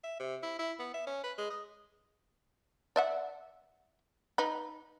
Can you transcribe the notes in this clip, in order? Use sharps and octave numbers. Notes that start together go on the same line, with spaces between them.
E5
C3
E4
E4
B3
E5
C#4
B4
G#3
D#5
D5 E5 F#5
D#4 B4